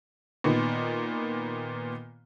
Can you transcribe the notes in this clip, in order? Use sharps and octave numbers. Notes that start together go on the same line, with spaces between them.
A#2 D#3 B3